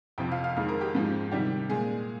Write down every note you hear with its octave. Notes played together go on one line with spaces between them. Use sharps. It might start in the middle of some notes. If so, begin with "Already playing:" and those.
F2 C3 F3 G5
F5
F5
F2 D#3 G#3 F5
A#4
G4
G#2 F3 G#3
C3 D#3 G3 G4
A#2 G#3 G#4